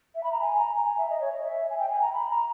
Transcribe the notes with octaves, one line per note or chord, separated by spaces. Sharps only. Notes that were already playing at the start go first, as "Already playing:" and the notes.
E5
B5
A#5
G#5
A#5
G#5
G#5
E5
D#5
C#5
D#5
E5
G#5
G5
G#5
A#5
B5
A#5